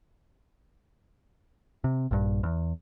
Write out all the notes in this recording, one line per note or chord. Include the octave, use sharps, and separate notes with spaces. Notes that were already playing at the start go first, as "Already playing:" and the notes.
C3
A#1 G2
E2